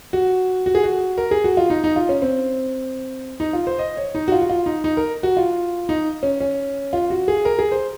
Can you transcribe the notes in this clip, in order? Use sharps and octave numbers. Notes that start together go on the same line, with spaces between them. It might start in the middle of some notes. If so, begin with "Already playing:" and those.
F#4
F#4
G#4
F#4
A#4
G#4
F#4
F4
D#4
D#4
F4
C#4
C4
D#4
F4
C5
D#5
C#5
D#4
F#4
F4
F#4
F4
D#4
D#4
A#4
F#4
F4
D#4
C#4
C#4
F4
F#4
G#4
A#4
G#4
C5